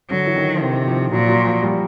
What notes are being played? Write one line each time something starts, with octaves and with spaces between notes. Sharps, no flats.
D3 F#3
E3
D#3
C3 D#3
F3
A#2 F#3
F#3
F3
G3